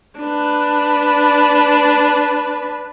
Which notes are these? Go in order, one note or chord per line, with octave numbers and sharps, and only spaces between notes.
D4 B4